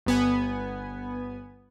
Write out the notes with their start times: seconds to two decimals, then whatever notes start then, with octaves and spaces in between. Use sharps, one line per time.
0.06 G1 B3 G#5